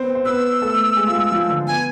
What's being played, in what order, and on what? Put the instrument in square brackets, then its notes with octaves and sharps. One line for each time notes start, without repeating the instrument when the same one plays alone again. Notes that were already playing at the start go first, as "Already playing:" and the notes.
Already playing: [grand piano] B3 C4 C5
C5
[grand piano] B3 B4 [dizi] E6
[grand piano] A3 A4
G#3 G#4
F4
G#3 G#4
F3 F4
D3 D4
[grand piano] B3 [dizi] G#5